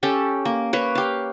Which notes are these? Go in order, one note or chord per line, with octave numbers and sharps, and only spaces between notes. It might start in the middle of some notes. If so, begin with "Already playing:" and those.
C#4 G4 A4
A#3
A#3 B4 C#5
G4 F5